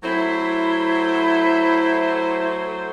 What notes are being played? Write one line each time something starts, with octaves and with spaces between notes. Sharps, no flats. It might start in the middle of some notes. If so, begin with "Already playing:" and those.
F#3 A3 E4 C5